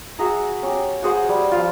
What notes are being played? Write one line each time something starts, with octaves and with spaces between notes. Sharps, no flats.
F#4 G#4 E5 A#5
C#4 G4
F#4 G#4 C5 F#5
G3
F3 F4